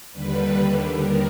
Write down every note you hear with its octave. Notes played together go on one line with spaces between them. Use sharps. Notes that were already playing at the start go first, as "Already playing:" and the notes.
D#2 D3 G3 B4
D#2 D#3 G3 A#4